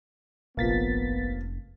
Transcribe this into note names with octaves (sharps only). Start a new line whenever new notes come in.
F1 A#1 F3 A#3 B3 A6 B6